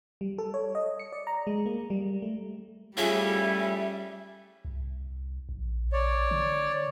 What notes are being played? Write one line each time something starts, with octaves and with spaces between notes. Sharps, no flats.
G3
A4
C#5
D#5
C#7
D5
A#5
G#3
A#3
G3
A3
G3 A3 C#4 E4 F4 G#4 E5
C2
A#1
C#5 D5
D3